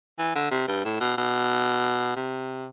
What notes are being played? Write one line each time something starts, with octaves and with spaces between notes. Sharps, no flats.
E3
D3
C3
G2
A2
B2
B2
C3